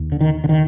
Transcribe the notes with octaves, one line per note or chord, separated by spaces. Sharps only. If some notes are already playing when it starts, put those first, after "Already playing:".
Already playing: D#2
D3
D#3
D3
D#3